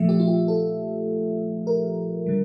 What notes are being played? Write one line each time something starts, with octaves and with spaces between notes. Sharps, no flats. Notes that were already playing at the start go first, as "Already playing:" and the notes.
Already playing: A#2 F3 A3 E5
G4
F4
G4
A4
A#4
D3 G3